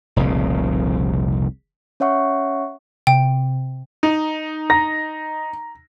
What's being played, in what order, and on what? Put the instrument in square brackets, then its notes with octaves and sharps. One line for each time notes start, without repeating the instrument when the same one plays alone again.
[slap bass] F1 C2 A#2 C#3
[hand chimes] C#4 C#5 E5 F#5 C#6
[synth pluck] C3 [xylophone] G5
[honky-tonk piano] D#4
[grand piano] A#5 A#6